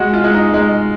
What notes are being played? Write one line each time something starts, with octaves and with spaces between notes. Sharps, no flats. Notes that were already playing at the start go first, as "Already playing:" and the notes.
Already playing: G#3 F#4
F4
G#3
D#4
G#3